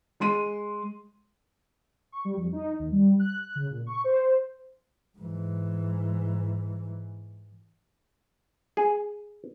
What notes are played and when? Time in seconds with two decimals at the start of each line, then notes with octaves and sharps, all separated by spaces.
0.20 G#3 C6 D#7
2.12 C#6
2.25 G3
2.37 F2
2.52 D#4
2.79 D#2
2.92 G3
3.19 F#6
3.43 F#6
3.56 C#3
3.71 A#2
3.87 C#6
4.04 C5
5.18 G#2 E3
8.77 G#4